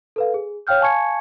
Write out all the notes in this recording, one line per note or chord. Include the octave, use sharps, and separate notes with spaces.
A4 B4 F5
G#4
C#5 F5 G5 F6 G6
F5 G#5 A5 C#6 G#6 C#7